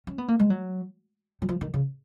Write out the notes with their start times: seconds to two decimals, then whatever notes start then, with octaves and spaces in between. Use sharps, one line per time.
0.07 C#4
0.18 B3
0.28 A#3
0.39 G#3
0.50 F#3
1.42 F#3
1.49 F3
1.61 D#3
1.74 C#3